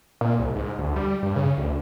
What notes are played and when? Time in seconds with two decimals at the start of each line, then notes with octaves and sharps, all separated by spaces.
0.21 A#2
0.39 C2
0.56 G#2
0.79 D2
0.96 G3
1.23 G2
1.36 C#3
1.57 D2